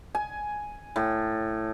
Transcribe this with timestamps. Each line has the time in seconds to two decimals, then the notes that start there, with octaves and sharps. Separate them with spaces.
0.15 G#5
0.96 A2